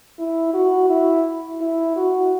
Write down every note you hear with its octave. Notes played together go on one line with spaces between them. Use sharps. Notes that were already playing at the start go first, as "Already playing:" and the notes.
E4
F#4
E4
E4
F#4